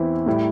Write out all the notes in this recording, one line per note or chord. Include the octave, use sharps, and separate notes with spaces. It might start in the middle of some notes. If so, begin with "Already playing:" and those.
Already playing: E2 E3 C4 E4
A2 G3 E4